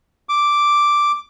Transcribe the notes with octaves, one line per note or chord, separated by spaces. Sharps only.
D6